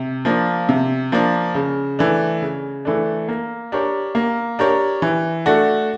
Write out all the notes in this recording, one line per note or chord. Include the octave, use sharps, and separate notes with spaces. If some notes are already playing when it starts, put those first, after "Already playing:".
Already playing: C3
F3 A#3 D4
C3
F3 A#3 D4
C#3
E3 A3 D4
C#3
E3 A3 D4
A#3
D4 G4 A#4 C#5
A#3
D4 G4 A#4 C#5
E3
A3 D4 F#4